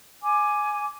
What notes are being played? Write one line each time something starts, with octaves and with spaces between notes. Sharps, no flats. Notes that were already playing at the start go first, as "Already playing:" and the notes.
G#5 D6